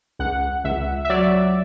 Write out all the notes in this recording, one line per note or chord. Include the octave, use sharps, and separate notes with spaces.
C#2 F#5
C#2 E5
E5
F#3 D5